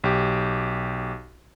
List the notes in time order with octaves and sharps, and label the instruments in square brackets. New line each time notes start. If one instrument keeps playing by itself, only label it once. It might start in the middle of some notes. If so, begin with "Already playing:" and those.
[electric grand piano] B1 G4